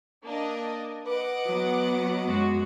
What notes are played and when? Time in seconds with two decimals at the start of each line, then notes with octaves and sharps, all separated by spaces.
0.23 A#3 D4 D#5
1.06 B4 D#5 F#5 D6
1.46 F#3 B3
2.26 F#2 G#3 F#4